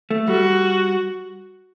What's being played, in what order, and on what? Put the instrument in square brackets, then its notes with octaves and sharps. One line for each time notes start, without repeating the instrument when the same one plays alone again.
[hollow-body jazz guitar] A3
[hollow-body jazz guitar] G3 [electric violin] F#4